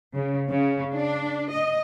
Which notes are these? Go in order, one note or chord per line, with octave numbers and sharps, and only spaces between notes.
C#3
C#3
D4
D#5